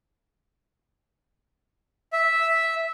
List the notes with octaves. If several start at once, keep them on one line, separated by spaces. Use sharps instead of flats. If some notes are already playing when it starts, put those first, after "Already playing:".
E5